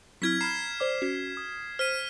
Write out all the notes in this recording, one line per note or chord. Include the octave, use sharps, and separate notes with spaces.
F#3 C4 E4 F6 G#6 B6
A#5 B5 F6 C7 E7
C5 D5 D6
C#4 F#4
D#6
C5 F6 B6 D#7